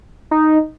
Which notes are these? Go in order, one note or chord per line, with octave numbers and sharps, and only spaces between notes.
D#4